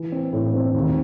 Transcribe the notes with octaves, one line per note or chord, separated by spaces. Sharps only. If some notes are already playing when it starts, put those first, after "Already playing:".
Already playing: E3
C4
A2
C4
D#2